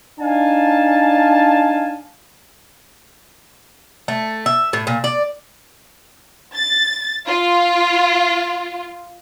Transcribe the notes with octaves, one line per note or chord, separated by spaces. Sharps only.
D4 D#4 F5 G#5 A5
A3
E5
A2
A#2
D5
A6
F4